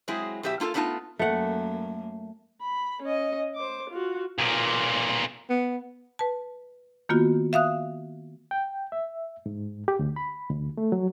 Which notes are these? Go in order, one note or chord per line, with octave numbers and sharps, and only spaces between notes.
F#3 G#3 C4 E4 G#4
B2 F#3 G4 B4 E5
A#3 F4 F#4 A4
A3 B3 D4 D#4 F4 A5
F#2 A3 A#3 F#5
B5
C#4 D#5
C5 D6
F4 F#4
B1 A#2
B3
B4 A5
D#3 A#3 B3 F4 F#4
E5 F5 D#6 F#6
G5
E5
G#2
G4
D2
B5
D2
A3
F#3